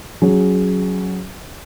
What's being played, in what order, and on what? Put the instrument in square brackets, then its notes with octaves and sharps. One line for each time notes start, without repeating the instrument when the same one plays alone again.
[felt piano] F#3 C#4 G#4